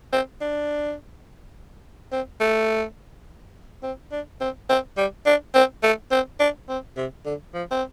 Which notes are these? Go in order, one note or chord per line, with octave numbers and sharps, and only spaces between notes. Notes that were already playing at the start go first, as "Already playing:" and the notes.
C4
D4
C4
A3
C4
D4
C4
C4
G3
D4
C4
A3
C4
D4
C4
C3
D3
F3
C4